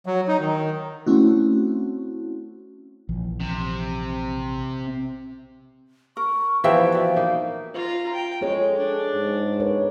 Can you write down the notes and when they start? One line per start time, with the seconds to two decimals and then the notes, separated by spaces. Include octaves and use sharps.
0.06 F#3
0.28 D#4
0.40 D#3
1.07 A3 C4 C#4 E4 F#4
3.09 A#1 E3 F3
3.40 C3
6.17 A#4 C#6
6.64 E3 F3 B3 G4 E5 F5 G5
6.92 F#4 D5
7.16 A#3 D#4
7.74 F4 A#5
8.13 G5
8.41 G#3 F4 G#4 A4 C#5
8.78 D4
9.14 G#2
9.60 A#4 B4 C#5